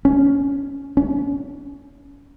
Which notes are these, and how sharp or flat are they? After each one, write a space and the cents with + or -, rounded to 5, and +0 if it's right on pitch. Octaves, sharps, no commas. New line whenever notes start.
C#4 +10
C#4 +30